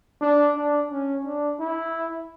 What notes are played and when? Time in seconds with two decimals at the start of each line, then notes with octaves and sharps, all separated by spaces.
0.21 D4
0.56 D4
0.91 C#4
1.25 D4
1.60 E4